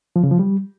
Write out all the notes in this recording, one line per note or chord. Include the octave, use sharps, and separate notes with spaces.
F3
C#3
F3
G3